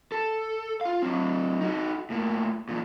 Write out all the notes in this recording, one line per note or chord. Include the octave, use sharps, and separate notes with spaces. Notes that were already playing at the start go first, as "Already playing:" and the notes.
A4
F4 F5
F#3 C4
D#4 F#4
A2 A#3
E2 A#2